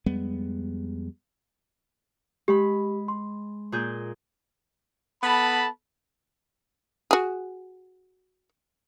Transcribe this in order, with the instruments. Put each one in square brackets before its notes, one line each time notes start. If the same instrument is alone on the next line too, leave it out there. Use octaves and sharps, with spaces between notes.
[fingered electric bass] F2 G3 G#3 B3
[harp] G#3 B5 [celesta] G4
[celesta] C6
[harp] A#2 G#4 G6
[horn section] B3 A4 A5 B5
[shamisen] F#4 G#4